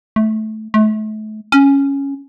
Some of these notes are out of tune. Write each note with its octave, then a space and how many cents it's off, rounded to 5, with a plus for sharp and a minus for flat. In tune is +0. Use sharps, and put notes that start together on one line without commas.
A3 -15
A3 -35
C#4 +0